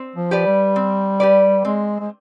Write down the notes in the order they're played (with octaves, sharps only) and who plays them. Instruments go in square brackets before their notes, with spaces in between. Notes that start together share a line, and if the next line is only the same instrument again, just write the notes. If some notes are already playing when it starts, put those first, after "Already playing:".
Already playing: [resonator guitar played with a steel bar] C4
[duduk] F3
[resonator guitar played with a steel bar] G4 B4 D5
[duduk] G3
[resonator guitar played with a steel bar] C4
G4 B4 D5
[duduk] G#3 [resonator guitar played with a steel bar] C4
[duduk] G#3